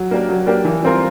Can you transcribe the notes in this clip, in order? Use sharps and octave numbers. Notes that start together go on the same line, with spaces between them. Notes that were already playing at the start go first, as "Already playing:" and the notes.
Already playing: F#3
A#3 D4 G4 A#4
F#3
A#3 D4 G4 A#4
E3
G3 C4 F4 A#4